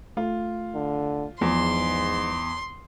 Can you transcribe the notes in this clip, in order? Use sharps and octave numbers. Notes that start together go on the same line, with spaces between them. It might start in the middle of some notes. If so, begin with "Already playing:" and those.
A3 F4
D3
E2 G#2 F3 C6